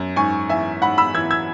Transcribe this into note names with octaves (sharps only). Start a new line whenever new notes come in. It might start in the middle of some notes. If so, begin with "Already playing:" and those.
Already playing: F#2
G#2 G#5 C#6
E3 E5 G#5
G#2 F#5 B5
B5 E6
E3 E6 G#6
E6 G#6